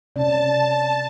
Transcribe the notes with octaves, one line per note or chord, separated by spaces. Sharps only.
C3 C#4 D5 A5